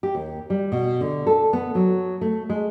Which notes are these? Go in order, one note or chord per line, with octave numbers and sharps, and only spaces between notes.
G4
D#2
G3
B2
D3
A4
B3
F#3
A3
G#3